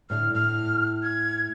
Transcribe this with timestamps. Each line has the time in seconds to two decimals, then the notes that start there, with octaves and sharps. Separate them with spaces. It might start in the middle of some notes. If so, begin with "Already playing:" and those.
0.10 A2 D3 F6
0.34 A2 F6
1.03 G#6